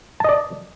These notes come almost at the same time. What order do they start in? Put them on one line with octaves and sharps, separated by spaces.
A5 D#5 D5